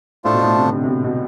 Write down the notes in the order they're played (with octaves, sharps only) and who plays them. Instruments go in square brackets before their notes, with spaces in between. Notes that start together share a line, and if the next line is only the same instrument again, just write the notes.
[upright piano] A2 [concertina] A3 D4 F4 A4 C5
[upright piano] B2
A2
C3
D3
C3
C3
B2
B2